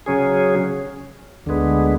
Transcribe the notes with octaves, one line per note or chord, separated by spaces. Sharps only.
C#3 F#3 C#4 G#4
D2 D3 G#3 B3